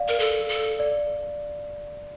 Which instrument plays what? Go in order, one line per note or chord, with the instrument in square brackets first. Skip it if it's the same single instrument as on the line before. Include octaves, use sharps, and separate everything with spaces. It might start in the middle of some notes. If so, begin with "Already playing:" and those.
Already playing: [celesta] D5 F5
[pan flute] A#4
A4
A4
[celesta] D5